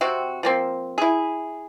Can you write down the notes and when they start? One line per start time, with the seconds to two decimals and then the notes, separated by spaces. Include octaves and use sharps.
0.01 C3 C4 F#4
0.43 F3 A#3 C4
0.98 E4 G#4